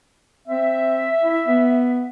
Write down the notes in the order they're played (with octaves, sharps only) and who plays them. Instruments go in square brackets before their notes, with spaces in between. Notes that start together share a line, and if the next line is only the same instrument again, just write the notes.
[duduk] C4 [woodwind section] E5
[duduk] E4
B3